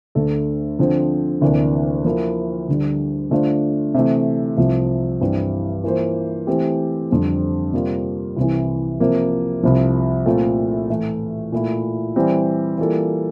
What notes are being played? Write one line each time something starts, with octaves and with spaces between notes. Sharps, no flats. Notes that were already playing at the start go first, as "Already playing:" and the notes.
D2 D3 A3 D4 A4
D3 F3 C4
D2 C3 E3 A#3 D4
F3 A#3 E4 A#4
D2 D3 G3
D3 A3 D4 F4 C5
C3 E3 A3
C2 C3 F3
G2 E3 G3 C4
E3 A#3 F4 C5
E3 A3 C4 G4
F2 D3 G3 C4
C3 G3 A#3 F4
C2 C3 E3
C3 F3 A#3
C2 C3 F3
A#2 A3 C4 F4 A4
A2 E3 A3
A#2 A3 E4
E3 G3 C4 G4
E3 G3 A#3 F4 A4